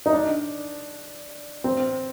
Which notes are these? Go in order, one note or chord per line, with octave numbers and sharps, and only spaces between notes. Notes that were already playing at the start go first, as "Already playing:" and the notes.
D#4
D4
C4